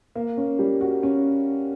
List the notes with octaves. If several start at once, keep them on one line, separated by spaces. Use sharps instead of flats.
A#3
C#4
G3
F#4
C#4